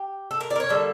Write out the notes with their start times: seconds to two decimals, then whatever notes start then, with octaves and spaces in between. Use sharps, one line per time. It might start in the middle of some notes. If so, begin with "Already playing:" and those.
Already playing: G4
0.31 A4
0.41 A#4
0.50 D5
0.56 A#4
0.60 C#5
0.69 D3 G3 A#3 A4